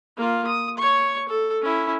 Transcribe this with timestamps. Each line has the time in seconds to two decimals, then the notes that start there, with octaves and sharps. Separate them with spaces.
0.17 A#3 F4
0.47 D#6
0.78 C#5 C#6
1.29 A4
1.62 C#4 E4